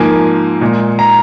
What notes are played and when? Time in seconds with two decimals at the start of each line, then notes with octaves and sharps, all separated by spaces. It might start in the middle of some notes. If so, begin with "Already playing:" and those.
Already playing: G#2 F3 A#3 G#5
0.61 A#2 G#3
0.99 A#5